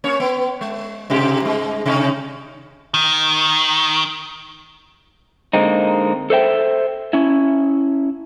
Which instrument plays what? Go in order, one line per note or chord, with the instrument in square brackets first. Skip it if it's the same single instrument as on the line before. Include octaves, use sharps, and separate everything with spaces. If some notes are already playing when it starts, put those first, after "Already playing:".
[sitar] A#3 C#4 C#5
B3
G#3
G#2 C3 G4
G2 G#3
C3 C#4 D#4
[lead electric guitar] D#3
[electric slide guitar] D3 G#3 A#3 C4 D#4
A4 C5 E5 G5
C#4 E4